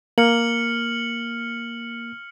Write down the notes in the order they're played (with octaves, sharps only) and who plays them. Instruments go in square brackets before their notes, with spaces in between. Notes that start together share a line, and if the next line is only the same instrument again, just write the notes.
[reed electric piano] A#3 [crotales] F6 C#7 F#7